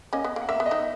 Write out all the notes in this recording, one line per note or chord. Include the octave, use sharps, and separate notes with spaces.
A#3 C#4 D#5
B3
A#3
F#5
A#3 E5
B3
D#5
B3 D#4